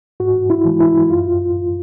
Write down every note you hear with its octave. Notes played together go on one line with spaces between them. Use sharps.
G#2 F#4
E4
E3 G#3
E4
F#2 F4